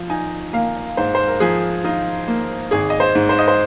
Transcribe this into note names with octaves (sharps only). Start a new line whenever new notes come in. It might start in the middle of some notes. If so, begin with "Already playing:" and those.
Already playing: F3
D#4 G#5
A#3 F5
G#2 C5
C5
A#4
F3 G#4
D#4 F4
A#3
G#1 G#4
D#5
C5
G#2
C5
D#5
C5